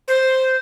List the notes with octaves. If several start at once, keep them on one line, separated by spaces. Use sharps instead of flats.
C5